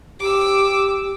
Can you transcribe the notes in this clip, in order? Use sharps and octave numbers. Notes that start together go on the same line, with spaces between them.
G4 D6 E6